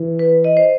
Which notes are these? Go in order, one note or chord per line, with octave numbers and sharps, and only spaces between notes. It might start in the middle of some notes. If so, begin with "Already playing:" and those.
Already playing: E3
B4
D#5
C5